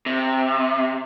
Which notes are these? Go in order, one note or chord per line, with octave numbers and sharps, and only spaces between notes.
C3